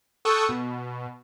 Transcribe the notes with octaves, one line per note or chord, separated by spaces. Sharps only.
A4 G5 C#6 D#6 E6 F#6
B2